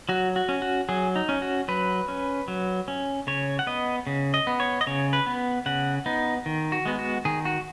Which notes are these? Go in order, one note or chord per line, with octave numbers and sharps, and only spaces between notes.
F#3 F#4
F#4
C#4
F#4
F#3 G#4
D#4
C#4
F#4
F#3 B4
C#4
F#3
C#4
C#3 C#5
F#5
B3 D#5
C#3
D#5
B3
C#5
D#5
C#3 C#5
B4
B3
C#3 F#5
B3 D#4
D#3
F#4
G#3 B3
F#4
D#3 G#4
F#4